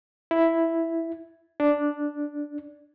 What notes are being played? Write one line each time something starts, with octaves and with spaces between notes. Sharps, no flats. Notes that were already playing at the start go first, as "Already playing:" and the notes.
E4
D4